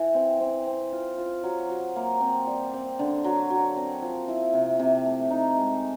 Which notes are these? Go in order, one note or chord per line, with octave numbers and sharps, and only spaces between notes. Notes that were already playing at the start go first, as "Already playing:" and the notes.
Already playing: E3
C4
C4
C4
F4
F4
F#3
F#3
A#3
C4
G3
C4
D3
F#3
F#3
C4
F3
E4
C3
C3
A3
D#4
G#3